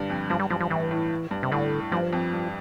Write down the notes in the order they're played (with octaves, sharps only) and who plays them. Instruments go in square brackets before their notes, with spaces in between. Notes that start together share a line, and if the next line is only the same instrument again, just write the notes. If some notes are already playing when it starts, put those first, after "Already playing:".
Already playing: [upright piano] G2 D3
F2
[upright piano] G2 [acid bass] F3
[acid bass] G3
[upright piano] G2 [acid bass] F3
[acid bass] F3
[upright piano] A2 [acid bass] E3
[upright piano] A2
G2
[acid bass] C3
[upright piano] A2 [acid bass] D3
[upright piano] G2 [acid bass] F3
[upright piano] F2
G2